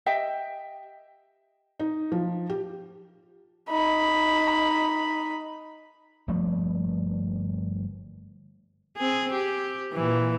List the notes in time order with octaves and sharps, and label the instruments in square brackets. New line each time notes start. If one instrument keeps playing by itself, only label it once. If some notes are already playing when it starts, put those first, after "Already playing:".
[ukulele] G4 D#5 E5 G5
[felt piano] D#4
F3
G4
[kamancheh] D#4 B5
[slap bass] G1 F3 A3 A#3
[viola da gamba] C4 G#4
G4
A#2 E3